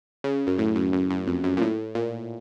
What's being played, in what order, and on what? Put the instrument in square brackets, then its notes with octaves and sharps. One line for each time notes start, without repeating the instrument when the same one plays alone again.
[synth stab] C#3
F#2
A2
F#2
F#2
F#2
F2
F#2
A#2
A2
A#2